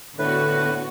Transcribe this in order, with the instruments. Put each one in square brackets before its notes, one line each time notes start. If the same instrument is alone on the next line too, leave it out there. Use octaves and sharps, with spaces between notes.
[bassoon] A2 [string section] D3 B3 F#4 [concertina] B4